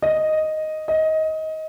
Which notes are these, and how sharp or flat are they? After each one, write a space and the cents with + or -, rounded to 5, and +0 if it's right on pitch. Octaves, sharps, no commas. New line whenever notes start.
D#5 +0
D#5 +20